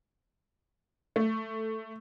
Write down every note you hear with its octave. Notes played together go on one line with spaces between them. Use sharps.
A3